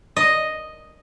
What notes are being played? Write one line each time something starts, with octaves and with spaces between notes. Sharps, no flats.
D#5